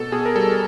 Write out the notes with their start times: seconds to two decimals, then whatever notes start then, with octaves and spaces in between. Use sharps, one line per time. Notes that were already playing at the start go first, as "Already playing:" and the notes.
Already playing: B2 A4
0.12 B2 G#4
0.26 A#4
0.35 G3 A4